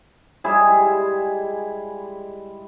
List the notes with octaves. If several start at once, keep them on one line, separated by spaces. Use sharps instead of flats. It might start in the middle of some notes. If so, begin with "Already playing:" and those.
G3 G#3 E4 G#4